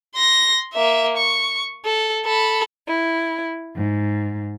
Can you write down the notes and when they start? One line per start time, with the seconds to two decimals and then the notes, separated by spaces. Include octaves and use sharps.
0.15 C6 A#6
0.73 A#3 E5
1.17 C#6
1.85 A4
2.25 A4 B5
2.88 E4
3.75 G#2